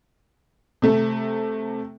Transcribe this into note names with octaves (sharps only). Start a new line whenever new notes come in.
C3 A3